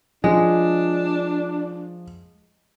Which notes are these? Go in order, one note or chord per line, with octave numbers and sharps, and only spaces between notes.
F3 G#3 D4